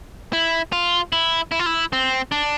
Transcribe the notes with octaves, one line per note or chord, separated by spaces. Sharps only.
E4
F4
E4
E4
F4
E4
C4
D4